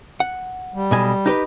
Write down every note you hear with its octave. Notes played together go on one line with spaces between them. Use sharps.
F#5
G3
B1 B2 G#5
D#4 G4 B4